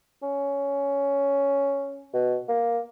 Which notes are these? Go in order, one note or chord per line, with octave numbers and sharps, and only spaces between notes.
C#4
B2
A#3